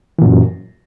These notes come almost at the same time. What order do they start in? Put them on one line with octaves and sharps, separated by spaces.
E3 A#2 F#2